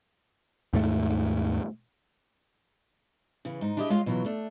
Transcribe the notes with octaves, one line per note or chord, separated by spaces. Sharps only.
D#2 G#2 A3
C#3 E3
G#2 D#4
D4 E4 G4 G#4 C5 D#5
G#3 F4 C#5 D#5 F5
B2 E3 F#3 F4
A3 D4